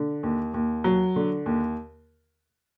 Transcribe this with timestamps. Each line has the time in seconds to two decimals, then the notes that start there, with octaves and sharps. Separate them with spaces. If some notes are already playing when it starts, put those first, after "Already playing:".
Already playing: D3
0.23 D#2
0.54 D#2
0.84 F#3
1.16 D3
1.46 D#2